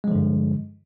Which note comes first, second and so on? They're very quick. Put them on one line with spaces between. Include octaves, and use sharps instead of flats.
G#3 F3 D3 G2